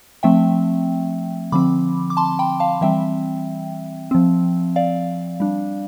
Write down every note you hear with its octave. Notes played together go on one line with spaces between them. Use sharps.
F3 A3 C4 E5 G5
D3 F3 C4 B5 D6
D6
A5 C6
G5 B5
F5 A5
E3 G3 C4 E5 G5
F3 C4
D5 F5
G3 D4